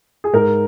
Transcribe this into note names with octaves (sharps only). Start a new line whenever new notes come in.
G#4
G#2 A#4